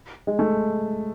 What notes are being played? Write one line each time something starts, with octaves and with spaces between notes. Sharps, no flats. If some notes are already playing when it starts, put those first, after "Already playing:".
G#3
A3